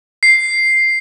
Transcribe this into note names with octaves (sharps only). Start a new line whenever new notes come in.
C7